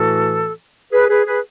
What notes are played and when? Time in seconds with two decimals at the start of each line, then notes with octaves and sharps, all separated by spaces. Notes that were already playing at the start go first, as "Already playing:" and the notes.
Already playing: A2 E3 A3 F#4 A4
0.92 G#4 B4
1.09 G#4 B4
1.26 G#4 B4